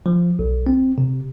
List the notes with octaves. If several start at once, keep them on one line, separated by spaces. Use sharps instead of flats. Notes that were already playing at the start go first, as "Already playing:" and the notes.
F3
B1
C4
C3